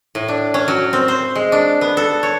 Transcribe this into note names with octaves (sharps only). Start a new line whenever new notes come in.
A2
D4
C#4
F#3
C4
C5
G#3
D4
B3
A4
C#5